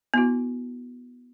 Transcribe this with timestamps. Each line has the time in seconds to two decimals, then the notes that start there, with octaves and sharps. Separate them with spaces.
0.14 B3 E4 F#4